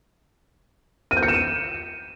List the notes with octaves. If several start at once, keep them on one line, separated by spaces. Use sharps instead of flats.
D#7
G6
C#7
E7
D#7